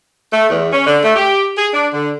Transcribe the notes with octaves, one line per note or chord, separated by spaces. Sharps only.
A3
E2
C#4
D3
A3
G4
G#4
D4
D3